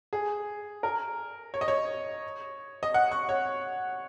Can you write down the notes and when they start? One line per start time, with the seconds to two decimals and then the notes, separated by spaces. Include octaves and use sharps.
0.13 G#4
0.83 A#4
1.54 C#5
1.61 D#5
1.68 C#5
2.83 D#5
2.94 F#5
3.12 C#6
3.29 C#5